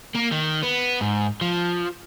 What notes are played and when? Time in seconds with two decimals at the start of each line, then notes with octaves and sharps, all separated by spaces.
0.15 A#3
0.31 D#3
0.63 B3
1.01 G#2
1.41 F3